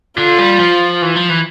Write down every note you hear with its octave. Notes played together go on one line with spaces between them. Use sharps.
D3 F4
G3
F3
E3
F3
E3